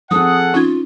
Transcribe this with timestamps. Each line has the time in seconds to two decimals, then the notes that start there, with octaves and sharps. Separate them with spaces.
0.11 F3 C4 G#4 A4 F#5 D#6
0.54 C#4 D#4 F4 G#6